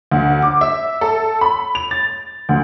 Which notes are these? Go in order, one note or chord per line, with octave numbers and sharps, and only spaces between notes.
D2
D6
E5
A4
B5
F7
A6
D2